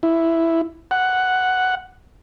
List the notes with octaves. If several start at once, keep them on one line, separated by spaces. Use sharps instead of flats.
E4
F#5